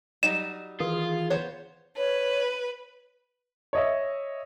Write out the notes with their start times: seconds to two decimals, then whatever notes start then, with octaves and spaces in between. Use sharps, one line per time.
0.23 F#3 G3 D#4 E7
0.80 D#3 E3 F4 G#4
1.30 B3 C5 C#5
1.97 B4 C#5
3.73 C#5 D#5 E5